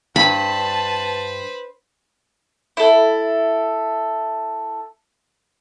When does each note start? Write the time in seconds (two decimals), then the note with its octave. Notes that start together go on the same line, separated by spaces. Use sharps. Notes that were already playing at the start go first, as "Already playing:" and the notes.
0.16 G2 B4 C5 A5 B5
2.77 E4 A4